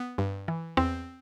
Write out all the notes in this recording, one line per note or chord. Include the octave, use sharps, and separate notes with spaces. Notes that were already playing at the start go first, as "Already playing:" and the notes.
Already playing: B3
G2
E3
E2 C4